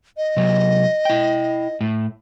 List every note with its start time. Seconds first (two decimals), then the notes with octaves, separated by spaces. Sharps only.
0.17 D#5
0.37 C3 F#3
1.05 E4 G5
1.81 A2